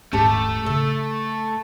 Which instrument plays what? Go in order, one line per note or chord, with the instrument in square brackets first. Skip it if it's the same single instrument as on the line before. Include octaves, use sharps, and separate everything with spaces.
[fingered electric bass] D#1 G#2 C#4 [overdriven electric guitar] A3 [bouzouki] G4 A5 A#5
[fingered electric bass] A2 C#3 [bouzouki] A4